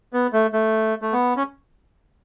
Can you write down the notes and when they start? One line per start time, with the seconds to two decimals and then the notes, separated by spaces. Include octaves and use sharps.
0.13 B3
0.33 A3
0.53 A3
1.02 A3
1.13 B3
1.37 C#4